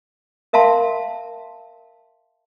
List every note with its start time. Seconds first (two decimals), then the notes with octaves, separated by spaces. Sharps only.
0.53 A#4 E5 F5 A5 C6